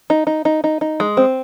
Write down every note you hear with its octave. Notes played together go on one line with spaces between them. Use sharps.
D#4
D#4
D#4
D#4
D#4
G#3
C4